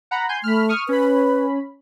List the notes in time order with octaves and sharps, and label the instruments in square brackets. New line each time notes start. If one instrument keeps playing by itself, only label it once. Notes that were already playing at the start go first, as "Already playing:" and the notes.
[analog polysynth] F#5 A#5 B5
G#5 C6 G6
[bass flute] A3 [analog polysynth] B5 F6
[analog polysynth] C#6 D#6 F6
[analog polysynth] C#4 B5 [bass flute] B4